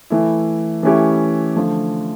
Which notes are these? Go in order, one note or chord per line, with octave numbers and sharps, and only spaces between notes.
E3 A3 E4
E3 A3 C#4 E4 G4
D3 F3 A3